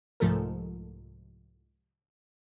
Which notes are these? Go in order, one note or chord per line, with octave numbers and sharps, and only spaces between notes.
C2 G#2 F3 A3 A4 A#4